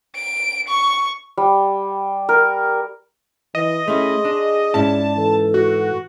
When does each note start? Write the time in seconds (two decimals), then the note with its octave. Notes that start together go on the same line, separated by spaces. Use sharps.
0.16 D7
0.68 C#6
1.37 G3
2.29 A#4
3.55 E3 D#5
3.88 A3 C#4 E4 G#4 C6
4.25 D4
4.74 G#2 C#4 E4 D5 A5
5.17 E3 A4
5.54 F#4